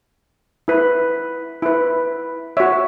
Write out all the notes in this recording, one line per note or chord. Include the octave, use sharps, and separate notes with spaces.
E4 B4
E4 B4
F#4 C#5 E5